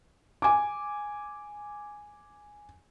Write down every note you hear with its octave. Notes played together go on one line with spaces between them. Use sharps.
G#5 D6